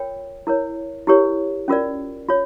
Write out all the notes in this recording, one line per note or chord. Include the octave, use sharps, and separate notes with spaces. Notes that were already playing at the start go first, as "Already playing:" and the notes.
Already playing: F4 A#4 C#5 G5
E4 A#4 C#5
E4 G4 A#4 C#5
C#4 F4 A#4 D5
F4 C#5